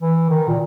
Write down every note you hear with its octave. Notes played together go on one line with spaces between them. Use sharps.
E3
D#3
A#2